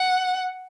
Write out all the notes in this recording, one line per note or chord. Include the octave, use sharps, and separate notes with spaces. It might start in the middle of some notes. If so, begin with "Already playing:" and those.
Already playing: F#5